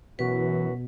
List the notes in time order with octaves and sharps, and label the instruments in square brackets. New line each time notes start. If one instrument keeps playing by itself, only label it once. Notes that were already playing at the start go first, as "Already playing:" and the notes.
[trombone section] F#2 F#4 [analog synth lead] B2 [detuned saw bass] E3 [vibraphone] B4